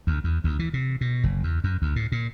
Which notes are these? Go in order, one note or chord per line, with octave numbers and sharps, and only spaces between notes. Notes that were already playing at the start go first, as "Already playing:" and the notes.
D2
E2
D2
E3
C3
B2
F#1
E2
F#2
D2
A2
A#2